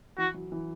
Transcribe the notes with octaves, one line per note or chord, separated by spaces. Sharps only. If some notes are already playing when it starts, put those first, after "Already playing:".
E3 F#4
F#3
E3